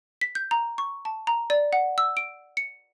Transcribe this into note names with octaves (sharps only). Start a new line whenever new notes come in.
B6
G6
A#5
C#6
A5
A#5
D5
F#5
E6
D7
C#7